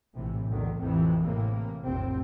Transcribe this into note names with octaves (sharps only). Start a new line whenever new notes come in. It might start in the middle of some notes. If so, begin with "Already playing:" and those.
A#1 A2 C3 E3
B1 E2 A2 D3 D#3
A1 F2 C3 D#3 E3
A2 C3 E3 A#3
F1 A#1 A2 C3 C4